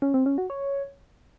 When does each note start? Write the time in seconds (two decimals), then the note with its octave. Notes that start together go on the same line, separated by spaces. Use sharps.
0.02 C#4
0.14 C4
0.26 C#4
0.38 F#4
0.50 C#5